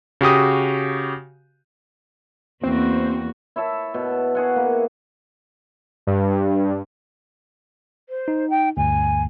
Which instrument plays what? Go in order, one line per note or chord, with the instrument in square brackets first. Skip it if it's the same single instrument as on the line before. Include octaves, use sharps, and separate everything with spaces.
[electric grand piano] C#3 F#4 G4 D#6
[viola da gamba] E2 A#3 F#4 [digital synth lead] C4
[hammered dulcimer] E4 C#5 E5 A5
B2
F#4 G#4 F#5
A#3
[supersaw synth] G2
[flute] C5
[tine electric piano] D#4
[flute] G5
[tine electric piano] D2 G2 [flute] G#5